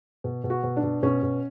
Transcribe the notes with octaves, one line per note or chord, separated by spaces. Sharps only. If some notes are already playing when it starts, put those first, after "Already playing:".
B2
B2
F#4
B2
D4
B2
B2 C#4
B2